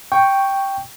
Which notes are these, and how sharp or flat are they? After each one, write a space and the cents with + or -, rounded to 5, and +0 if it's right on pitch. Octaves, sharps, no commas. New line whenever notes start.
G5 +0 C#6 +0